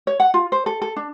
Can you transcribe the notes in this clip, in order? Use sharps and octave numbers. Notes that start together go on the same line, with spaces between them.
C#5
F#5
F4
C5
A4
A4
D4